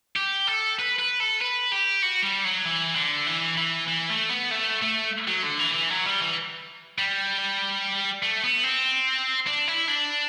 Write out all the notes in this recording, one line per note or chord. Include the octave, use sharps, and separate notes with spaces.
G4
A4
B4
B4
A4
B4
G4
F#4
G3
F#3
E3
D3
E3
E3
E3
A3
B3
A3
A3
F#3
D3
E3
E3
F#3
G3
E3
G3
A3
B3
C4
D4
E4
D4